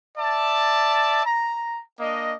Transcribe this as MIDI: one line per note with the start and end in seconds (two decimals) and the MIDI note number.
0.18 1.22 74
0.18 1.22 76
0.18 1.22 81
1.26 1.81 82
1.99 2.35 58
1.99 2.35 62
1.99 2.35 75